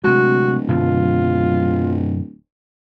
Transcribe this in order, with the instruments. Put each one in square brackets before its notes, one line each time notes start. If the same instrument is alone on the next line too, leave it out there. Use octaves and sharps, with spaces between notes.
[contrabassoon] D1 [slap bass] C3 G#3 [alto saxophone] F#4
[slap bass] F#2 B2 D3 [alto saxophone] F4